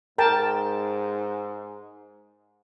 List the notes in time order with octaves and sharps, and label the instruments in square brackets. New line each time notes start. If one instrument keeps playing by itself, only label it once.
[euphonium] G#2 [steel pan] A#4 G5 A5